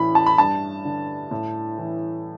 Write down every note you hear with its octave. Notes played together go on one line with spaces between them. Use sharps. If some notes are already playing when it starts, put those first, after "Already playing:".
Already playing: A2 E3 B5
A5
B5
G2 A5
D3
A2
E3